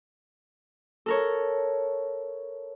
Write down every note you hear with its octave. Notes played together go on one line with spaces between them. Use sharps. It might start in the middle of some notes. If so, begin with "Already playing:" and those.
A4 A#4 C#5